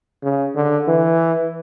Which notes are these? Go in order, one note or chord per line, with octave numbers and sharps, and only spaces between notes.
C#3
D3
E3